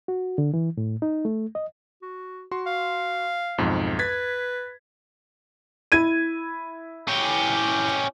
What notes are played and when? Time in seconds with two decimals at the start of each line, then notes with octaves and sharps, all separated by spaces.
0.08 F#4
0.38 D3
0.54 E3
0.77 A2
1.02 D#4
1.25 A3
1.55 D#5
2.02 F#4
2.51 F#4 C6
2.66 F5
3.58 B1 F2 G#2
3.99 B4 G#6 A6 B6
5.92 E4 G#6 D#7
7.08 C#4 G4